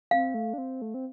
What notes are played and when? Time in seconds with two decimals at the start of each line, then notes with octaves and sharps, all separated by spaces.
0.11 C4 F5
0.34 A3
0.53 D4
0.58 C4
0.82 A3
0.94 C4